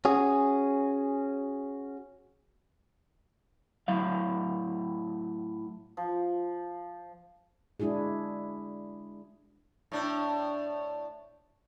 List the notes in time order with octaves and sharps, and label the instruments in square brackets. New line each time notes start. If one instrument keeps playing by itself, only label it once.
[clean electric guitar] C#4 F#4 G#4
A2 F#3 F5
[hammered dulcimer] F3
[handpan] G#3 D4 E4 F#4 G#4
[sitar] A2 D4